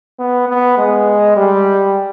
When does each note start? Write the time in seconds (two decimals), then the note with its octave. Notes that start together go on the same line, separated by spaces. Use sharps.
0.19 B3
0.49 B3
0.78 G#3
1.36 G3